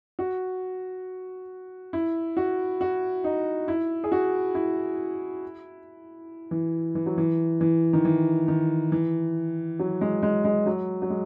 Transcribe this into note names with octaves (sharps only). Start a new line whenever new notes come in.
F#4
E4
F#4
F#4
D#4
E4
G#4
F#4
E4
E3
E3
F#3
E3
E3
D#3
E3
D#3
E3
F#3
G#3
G#3
G#3
F#3
F#3
G#3